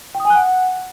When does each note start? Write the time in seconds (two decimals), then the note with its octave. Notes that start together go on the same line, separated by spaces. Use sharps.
0.15 G5
0.20 D#6
0.25 G#5
0.30 F#6
0.35 F#5